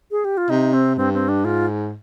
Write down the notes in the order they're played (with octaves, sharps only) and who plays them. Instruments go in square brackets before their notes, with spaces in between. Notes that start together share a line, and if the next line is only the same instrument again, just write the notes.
[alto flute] G#4
G4
F4
[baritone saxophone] C3 [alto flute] D#4
[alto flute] C4
[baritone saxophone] G2 [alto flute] C4
[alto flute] C4
D4
[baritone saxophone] G#2 [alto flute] F4